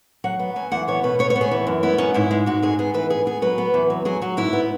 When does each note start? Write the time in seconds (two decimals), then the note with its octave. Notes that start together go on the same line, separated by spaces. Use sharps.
0.24 F#3 F#5
0.39 B3
0.56 F#3 G#5
0.72 E2 F#5
0.88 B3 C#5
1.03 B2 B4
1.19 B3 C#5
1.30 C#5
1.35 B3
1.41 G#4
1.51 E3
1.67 F#2
1.83 B3 E4
1.98 F#2 C#4
2.14 G#2 E4
2.31 G#3
2.46 G#2 F#4
2.62 G#2 G#4
2.79 B3 G#4
2.94 E3 B4
3.10 B3 G#4
3.26 B3 G#4
3.42 F#3 B4
3.58 B3
3.74 E2
3.90 F#3
4.05 F#3 G#4
4.22 F#3 F#4
4.37 G#2 E4
4.53 B3